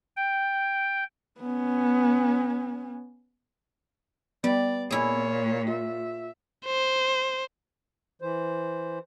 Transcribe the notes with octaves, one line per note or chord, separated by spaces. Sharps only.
G5
B3 C#4
G3 B3 D5
A#2 E4 G#4 C#5
F4 E5
C5
E3 C5